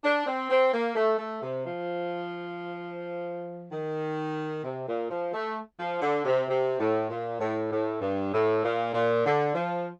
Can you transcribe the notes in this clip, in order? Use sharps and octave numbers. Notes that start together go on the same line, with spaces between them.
D4
C4
C4
A#3
A3
A3
C3
F3
D#3
C3
A#2
F3
A3
F3
D3
C3
C3
A2
A#2
A2
A2
G2
A2
A#2
A#2
D3
F3